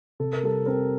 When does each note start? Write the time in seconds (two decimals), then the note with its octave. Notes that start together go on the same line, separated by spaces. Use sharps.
0.20 C3 A4
0.33 A#4
0.43 G3 A4
0.66 C4 A#4